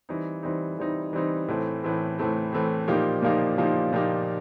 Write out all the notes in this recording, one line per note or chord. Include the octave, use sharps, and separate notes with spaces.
E3 G3 C4 D#4
E3 G3 C4 D#4
E3 G3 C4 D#4
E3 G3 C4 D#4
A2 E3 A3 C4
A2 E3 A3 C4
A2 E3 A3 C4
A2 E3 A3 C4
A#2 F3 A#3 D#4 G4
A#2 F3 A#3 D#4 G4
A#2 F3 A#3 D#4 G4
A#2 F3 A#3 D#4 G4